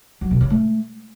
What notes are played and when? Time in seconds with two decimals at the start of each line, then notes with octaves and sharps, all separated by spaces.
0.21 F#3
0.31 B2
0.41 C#3
0.50 A3